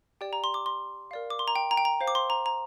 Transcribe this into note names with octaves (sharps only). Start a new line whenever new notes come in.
G4 D5 G5
A#5
C6
D6
C6
A#4 D5 F5
D6
C6
A#5
G5
A#5
G5
A#5
C5 F5
D6
C6
A#5
A#5